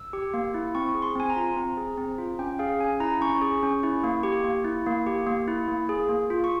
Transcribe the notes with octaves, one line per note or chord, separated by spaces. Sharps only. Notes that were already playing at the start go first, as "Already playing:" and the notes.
Already playing: E6
G4
A#3
E4
C4 C#6
G#4
C6
C4 G#5
A#5
F4
C4
G#4
C4
F4
C#4 G5
G#4 F5
C#4 G#5
E4 A#5
C#4 C#6
G#4
C#4
E4
A#3
G4
A#3
E4
A#3
G4
A#3
E4
A#3
G#4
A#3
F4
C#6